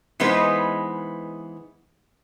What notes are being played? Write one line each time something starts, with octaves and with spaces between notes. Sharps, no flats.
E3 G#3 B3 D#4 B4 C5